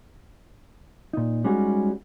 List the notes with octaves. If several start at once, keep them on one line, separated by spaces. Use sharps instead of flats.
A#2 D#4
G3 G#3 C#4 D#4 F#4 G#4